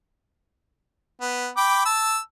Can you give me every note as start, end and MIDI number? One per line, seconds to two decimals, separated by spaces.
1.21 1.48 59
1.57 1.84 79
1.57 1.84 83
1.57 1.84 86
1.86 2.19 81
1.86 2.19 88